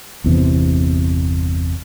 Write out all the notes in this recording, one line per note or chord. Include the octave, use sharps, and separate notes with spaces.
G1 E2 C3 E3